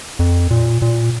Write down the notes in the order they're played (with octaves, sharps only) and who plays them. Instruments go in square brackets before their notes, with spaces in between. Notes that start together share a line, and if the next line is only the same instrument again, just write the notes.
[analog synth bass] F2
A#2
A#2